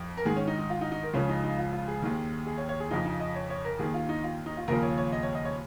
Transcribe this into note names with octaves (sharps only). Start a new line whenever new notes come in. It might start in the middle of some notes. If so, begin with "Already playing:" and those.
Already playing: F2
A#4
G#2 D#3 G#4
C#4
D#4
D#4
F4
D#4
D#4
A#4
C#2 C#3 F3 C#4
D#4
D#4
F4
F4
G#4
D#2 D#3
G#4
C#5
C#5
G#4
F2 C#3 F3 D#4
D#4
D#5
C#5
C#5
A#4
D#2 D#3 G#4
F4
D#4
F4
D#4
F4
D#2 C#3 F3 A#4
C#5
C#5
D#5
C#5
D#5
C#5